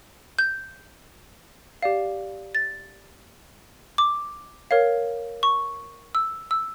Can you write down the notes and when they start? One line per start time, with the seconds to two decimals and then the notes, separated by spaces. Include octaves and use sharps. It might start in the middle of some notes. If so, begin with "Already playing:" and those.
0.39 G6
1.83 G4 D5 F5
2.55 A6
3.98 D6
4.71 A#4 C#5 F5
5.43 C#6
6.15 E6
6.51 E6